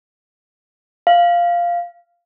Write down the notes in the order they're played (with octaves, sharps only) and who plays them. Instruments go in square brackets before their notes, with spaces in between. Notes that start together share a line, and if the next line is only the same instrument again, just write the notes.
[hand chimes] F5